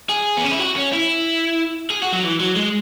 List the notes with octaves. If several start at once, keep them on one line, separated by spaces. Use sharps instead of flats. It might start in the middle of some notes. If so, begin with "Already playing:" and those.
G#4
B3
C#4
E4
F#4
C#4
E4
G#4
F#4
F#3
E3
F#3
G#3